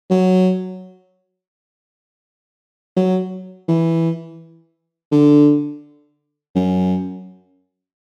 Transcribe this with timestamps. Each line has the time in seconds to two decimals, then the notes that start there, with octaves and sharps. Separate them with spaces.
0.10 F#3
2.97 F#3
3.68 E3
5.12 D3
6.55 F#2